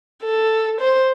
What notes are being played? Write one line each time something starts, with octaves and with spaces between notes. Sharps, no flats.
A4
C5